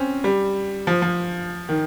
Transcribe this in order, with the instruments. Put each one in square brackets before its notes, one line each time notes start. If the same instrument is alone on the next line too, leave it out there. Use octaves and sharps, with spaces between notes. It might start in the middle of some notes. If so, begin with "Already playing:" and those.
Already playing: [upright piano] C4 C#4
G3
F3
F3
D#3